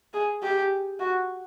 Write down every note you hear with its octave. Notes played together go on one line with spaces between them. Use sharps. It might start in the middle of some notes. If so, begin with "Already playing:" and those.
G#4
G4
F#4